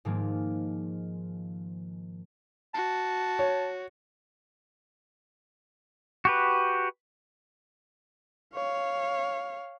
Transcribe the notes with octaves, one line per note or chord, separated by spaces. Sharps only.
G#2 D#3 F3 G#3 A#3
F#4 A5
C#5
F#4 G4 B4
C#5 F5